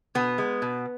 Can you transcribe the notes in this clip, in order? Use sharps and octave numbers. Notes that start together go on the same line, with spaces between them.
B2 B3
G#3
B2